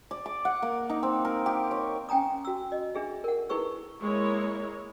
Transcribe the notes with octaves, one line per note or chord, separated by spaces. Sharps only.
D5
D6
F#5
A#3
D#4
C4
A#4
G4
C#5
C#4 G5 G#5 A#5 D#6
F#4 E6
D#5
D4 G#4 E5
A#4 F#5
D#4 E4 G#4 B4 C#6 E6
G#3 A#3 E4 C#5